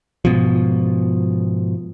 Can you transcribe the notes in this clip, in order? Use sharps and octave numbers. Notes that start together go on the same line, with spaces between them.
G#2 B2 F3